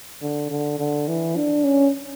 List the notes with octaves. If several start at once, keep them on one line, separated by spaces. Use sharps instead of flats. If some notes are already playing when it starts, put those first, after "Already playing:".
D3
D3
D3
E3
D4
C#4